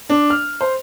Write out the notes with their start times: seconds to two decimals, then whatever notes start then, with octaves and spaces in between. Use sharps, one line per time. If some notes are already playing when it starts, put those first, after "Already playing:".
0.10 D4
0.30 F6
0.61 C5